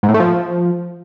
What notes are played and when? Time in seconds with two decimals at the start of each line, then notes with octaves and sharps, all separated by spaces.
0.03 G#2
0.09 A2
0.14 A3
0.20 F3